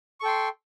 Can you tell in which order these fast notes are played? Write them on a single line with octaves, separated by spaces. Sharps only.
C#6 A4 G5 C6